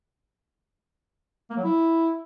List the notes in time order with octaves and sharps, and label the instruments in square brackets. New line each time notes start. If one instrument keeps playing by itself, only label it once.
[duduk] A#3
F#3
E4